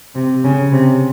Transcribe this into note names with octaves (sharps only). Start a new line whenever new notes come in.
C3
C#3
C3